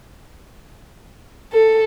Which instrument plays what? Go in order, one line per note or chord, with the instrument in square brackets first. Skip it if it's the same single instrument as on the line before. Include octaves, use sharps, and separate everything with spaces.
[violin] A4